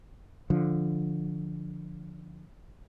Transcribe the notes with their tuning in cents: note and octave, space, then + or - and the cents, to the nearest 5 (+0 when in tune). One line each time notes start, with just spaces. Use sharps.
D3 +0 F3 +0